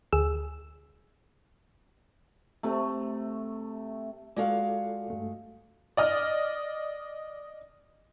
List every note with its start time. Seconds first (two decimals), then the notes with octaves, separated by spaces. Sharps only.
0.13 D2 G#4 E6
2.63 C3 A3
4.36 G#3 F4 F#4 A4 D5 F5
5.10 G2 A3
5.97 D5 D#5 F6